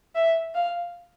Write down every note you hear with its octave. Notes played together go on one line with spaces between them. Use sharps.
E5
F5